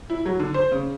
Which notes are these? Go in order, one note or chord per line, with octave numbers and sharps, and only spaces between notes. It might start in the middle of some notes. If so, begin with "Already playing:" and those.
E4
F#3
D3
C5
C#3